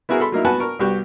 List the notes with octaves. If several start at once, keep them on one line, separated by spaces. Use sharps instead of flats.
B3 E4 F#4 G#4 A#4
A4 B5 C6
F#3 A#3 D#4 E4
B3 F#4 B4 F#5 G#5 A5
A#4 C#6
C2 B3 F#4 G4 C#6